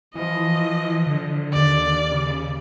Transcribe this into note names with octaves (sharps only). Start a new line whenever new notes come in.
E3 F3 D#5
D3
D#2 D5
C#3